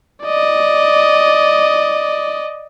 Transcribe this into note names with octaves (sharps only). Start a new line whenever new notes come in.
D5 D#5